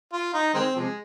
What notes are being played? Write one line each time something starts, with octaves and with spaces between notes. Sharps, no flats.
F4
D#4
D#3 G#3 C4
C3 F3 G#3